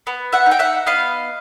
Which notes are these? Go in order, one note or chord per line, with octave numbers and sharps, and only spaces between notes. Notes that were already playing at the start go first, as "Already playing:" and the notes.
B3
E5 F#5
D#4
G5
E5 F#5
B3 D#5 F5